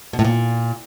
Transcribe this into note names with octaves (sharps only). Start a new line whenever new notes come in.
B2
A2
A#2